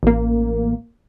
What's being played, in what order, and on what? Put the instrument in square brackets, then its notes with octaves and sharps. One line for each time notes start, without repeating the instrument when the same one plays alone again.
[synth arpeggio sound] A1 A#3